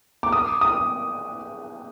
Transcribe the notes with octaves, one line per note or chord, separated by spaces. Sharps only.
D6
D#6
D#6